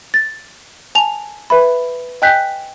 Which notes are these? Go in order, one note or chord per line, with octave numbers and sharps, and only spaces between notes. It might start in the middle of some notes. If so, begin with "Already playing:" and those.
A6
G#5 A5 F7
B4 E5 B5
D#5 G5 G#5 F#6 G6 B6